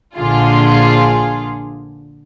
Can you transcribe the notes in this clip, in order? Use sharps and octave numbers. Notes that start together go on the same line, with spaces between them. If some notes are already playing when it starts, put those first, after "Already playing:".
A#1 D3 F4 G#4